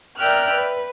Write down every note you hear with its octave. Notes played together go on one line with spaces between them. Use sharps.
A#4 D5 E5 G5 F6 F#6
B4